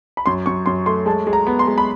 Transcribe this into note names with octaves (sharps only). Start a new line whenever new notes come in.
B5
F#2 C6
F#2 C#6
F#2 C6
A3 C6
G#3 A5
G#3
A#5
B3
C6
G#3
B5